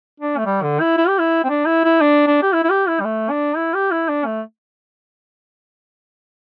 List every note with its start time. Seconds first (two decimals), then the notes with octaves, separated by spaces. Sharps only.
0.20 D4
0.37 A3
0.46 G3
0.63 D3
0.80 E4
0.97 E4
1.08 G4
1.19 E4
1.44 C4
1.50 D4
1.66 E4
1.84 E4
2.01 D4
2.27 D4
2.42 G4
2.53 E4
2.64 E4
2.70 G4
2.88 E4
3.00 G3
3.04 A3
3.30 D4
3.57 E4
3.74 G4
3.91 E4
4.09 D4
4.26 A3